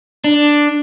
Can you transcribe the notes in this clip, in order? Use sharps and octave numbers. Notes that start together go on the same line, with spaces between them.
D4